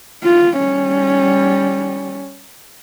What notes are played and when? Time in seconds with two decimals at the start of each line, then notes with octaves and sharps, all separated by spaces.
0.23 F4
0.58 G3 C#4